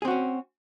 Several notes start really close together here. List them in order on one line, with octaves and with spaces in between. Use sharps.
G#4 C4 F#4 C#4